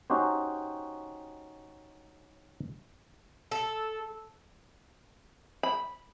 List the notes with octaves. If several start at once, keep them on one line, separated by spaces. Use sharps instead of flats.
C#4 D#4 F#4 G4 C5
A4
B5